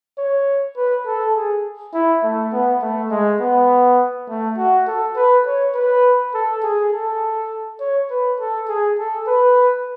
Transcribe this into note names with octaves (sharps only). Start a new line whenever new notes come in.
C#5
B4
A4
G#4
E4
A3
B3
A3
G#3
B3
A3
F#4
A4
B4
C#5
B4
A4
G#4
A4
C#5
B4
A4
G#4
A4
B4